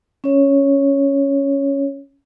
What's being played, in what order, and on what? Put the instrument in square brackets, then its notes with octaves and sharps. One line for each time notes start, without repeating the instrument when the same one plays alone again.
[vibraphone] C#4 C#5